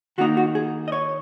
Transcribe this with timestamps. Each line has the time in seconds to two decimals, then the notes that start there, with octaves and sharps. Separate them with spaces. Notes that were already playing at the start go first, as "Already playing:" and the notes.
0.18 D#3 A#3 D#4 F#4
0.37 F#4
0.55 G#4
0.88 D#5
0.92 C#5